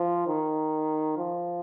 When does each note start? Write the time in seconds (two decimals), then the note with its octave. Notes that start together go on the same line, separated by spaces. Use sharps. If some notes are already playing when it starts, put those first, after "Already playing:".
Already playing: F3
0.27 D#3
1.18 F3